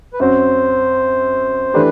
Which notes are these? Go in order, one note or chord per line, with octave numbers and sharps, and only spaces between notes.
B4
F#2 F#3 C4 F#4 C5
E3 A3 D4 G4 B4